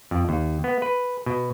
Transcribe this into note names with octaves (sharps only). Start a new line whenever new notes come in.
F2
D#2
B3
B4
B2